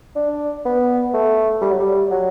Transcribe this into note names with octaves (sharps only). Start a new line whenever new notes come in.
D4
B3
A3
G3
F#3
G3
F#3